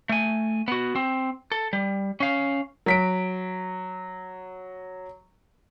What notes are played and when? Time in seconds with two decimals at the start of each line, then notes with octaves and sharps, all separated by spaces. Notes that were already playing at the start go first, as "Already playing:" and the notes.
0.09 A3 G#5
0.68 B3 F#4
0.96 C4
1.52 A4
1.73 G3
2.20 C#4 F5
2.86 F#3 B6 D7